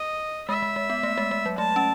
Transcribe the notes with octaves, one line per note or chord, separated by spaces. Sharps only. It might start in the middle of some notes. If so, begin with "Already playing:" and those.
Already playing: D#5
G#3 E5
G#3
G#3
B3
A3
G#3
G#3
F#3
A3 A5
C#4